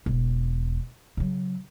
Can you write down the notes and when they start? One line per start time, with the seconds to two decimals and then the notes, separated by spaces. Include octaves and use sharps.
0.06 E1
1.17 C#3 F#3